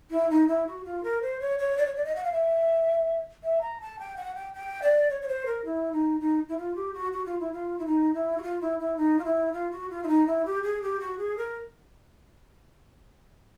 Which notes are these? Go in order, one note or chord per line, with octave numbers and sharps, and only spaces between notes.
E4
D#4
E4
F#4
F4
A#4
C5
C#5
C#5
D5
C#5
D5
D#5
F#5
F5
E5
E5
A#5
A5
G5
F#5
G5
G5
D5
C#5
C#5
C5
A#4
E4
D#4
D#4
E4
F4
G4
F#4
F#4
F4
E4
F4
E4
D#4
E4
F#4
F4
E4
E4
D#4
F4
E4
F4
F#4
F4
E4
D#4
E4
G4
G#4
G4
F#4
G#4
A#4